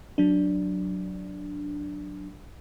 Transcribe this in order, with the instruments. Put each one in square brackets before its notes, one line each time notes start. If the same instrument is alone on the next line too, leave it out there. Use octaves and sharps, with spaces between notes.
[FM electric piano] F#3 D4